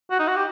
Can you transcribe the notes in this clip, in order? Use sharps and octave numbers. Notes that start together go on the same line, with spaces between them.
F#4
D#4
F#4
G4